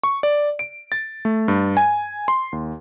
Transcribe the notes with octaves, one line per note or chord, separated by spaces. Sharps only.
C#6
D5
D7
A6
A3
G2
G#5
C6
D#2